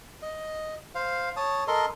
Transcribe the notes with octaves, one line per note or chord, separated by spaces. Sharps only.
D#5
C5 F5
C#5 A5 D#6
A4 A#4 D#5 C6